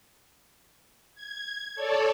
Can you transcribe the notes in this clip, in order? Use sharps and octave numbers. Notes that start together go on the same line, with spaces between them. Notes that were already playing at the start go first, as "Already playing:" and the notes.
G#6
A4 C#5 D5 A5